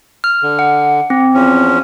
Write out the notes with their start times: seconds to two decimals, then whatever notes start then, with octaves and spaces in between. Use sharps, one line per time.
0.24 F6
0.43 D3
0.59 F#5
1.10 C4
1.34 E2 F3 C#4